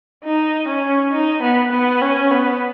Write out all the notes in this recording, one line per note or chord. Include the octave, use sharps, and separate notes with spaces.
D#4
C#4
D#4
B3
B3
C#4
B3